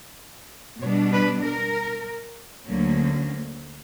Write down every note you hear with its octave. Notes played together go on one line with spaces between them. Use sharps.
B2 G3 B3 D4 C#5
B4
A#4
D2 D3 F#3 A#3 C#4